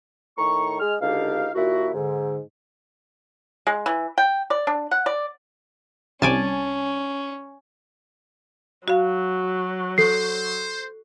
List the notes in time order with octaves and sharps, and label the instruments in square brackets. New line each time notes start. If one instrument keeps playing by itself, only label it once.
[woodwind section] A2 D#3 A#5 C#6
G#3 F6
C#2 D3 D#4 G4 F5
D#2 A#2 E4 F#4
G#2 D3
[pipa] G#3
E3
G5
D5
D4
F#5
D5
[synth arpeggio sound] C2 [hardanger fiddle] C#4 [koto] D5 G#5 A5
[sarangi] F#3 [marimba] F#4 F5
[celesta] A4 C7 [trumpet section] C5